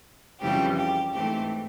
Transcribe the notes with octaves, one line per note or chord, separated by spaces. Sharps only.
F2 C#3 E3 G3 C4 G4
G4
G#2 E3 A3 C4 G4